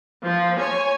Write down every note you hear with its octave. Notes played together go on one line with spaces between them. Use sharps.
F3
C#5 G#5